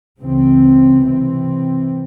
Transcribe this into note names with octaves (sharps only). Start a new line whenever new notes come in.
C#2 C#3 E3 C4
C3 E3 C4